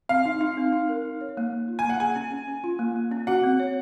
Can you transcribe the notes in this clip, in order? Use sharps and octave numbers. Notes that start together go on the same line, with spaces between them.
C4 F5
D#4
D#4
C4
D#4
A#4
D#4
C#5
A#3
A#3
F4
G#5
A#3
F#5
G#4 G#5
C#4
C#4
C#4
F4
A#3
A#3
C#4
F#4 F#5
C4
C#5